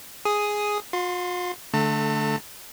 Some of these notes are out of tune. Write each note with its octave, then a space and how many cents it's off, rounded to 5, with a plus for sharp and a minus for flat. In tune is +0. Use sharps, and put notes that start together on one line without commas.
G#4 +0 D#6 +5
F4 +45 C6 -5
D3 +0 A3 -15 A5 +35